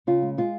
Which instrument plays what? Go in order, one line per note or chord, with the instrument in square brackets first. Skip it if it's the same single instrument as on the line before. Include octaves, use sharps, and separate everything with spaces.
[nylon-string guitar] C#3 F4
G#3
G#3 F4